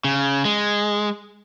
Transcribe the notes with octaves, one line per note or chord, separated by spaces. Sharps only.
C#3
G#3